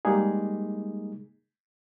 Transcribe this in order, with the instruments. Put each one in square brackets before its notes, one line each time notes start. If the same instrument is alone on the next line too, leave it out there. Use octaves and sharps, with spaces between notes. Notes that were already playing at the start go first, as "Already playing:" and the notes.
[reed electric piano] G3 G#3 A#3 D#4 G#4